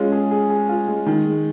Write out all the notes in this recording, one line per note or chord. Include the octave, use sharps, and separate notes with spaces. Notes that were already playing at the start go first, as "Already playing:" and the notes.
Already playing: G#3 C#4 F4
G#4
G#4
G#4
F4
G#3
D#3
G#3